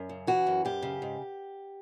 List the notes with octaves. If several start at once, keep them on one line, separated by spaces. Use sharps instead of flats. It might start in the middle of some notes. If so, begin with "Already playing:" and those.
Already playing: F#2
C#3
E3 F#4
F#2
F#2 G4
C#3
G#2